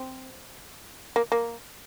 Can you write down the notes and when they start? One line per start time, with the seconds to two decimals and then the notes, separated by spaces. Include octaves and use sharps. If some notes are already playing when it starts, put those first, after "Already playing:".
Already playing: C4
1.16 A#3
1.32 A#3